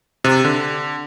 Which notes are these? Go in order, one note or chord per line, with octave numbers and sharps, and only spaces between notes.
C3
D3